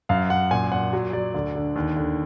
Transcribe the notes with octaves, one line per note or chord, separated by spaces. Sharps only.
F#2 F5
F#2 F#5
A#2 G#5
A#2 F#5
F#3
F#3 D5
D2
D3
D#2
D3